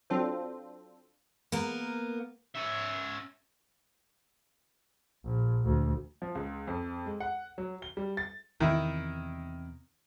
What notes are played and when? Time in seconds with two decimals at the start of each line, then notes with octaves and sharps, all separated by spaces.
0.10 F#3 C4 D4 F4 A4 C5
1.52 A#3 B3 A#4
2.55 C#4 E5
5.25 A#1
5.64 D2
6.22 F3
6.35 C#2
6.67 F2
7.06 G#3
7.20 F#5
7.58 F#3
7.82 G7
7.97 G3
8.17 A6
8.60 E2 C3 D#3 E4